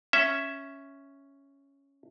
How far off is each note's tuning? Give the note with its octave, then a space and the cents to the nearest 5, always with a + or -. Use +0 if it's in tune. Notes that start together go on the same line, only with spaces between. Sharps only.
C#4 +0 E5 +0